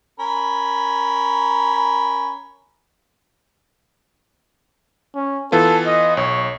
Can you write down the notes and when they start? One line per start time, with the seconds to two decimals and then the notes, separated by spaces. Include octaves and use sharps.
0.20 C#4 A#4 B5
5.15 C#4
5.52 E3 B3 F4 A4
5.86 D#5
6.17 B1 C#5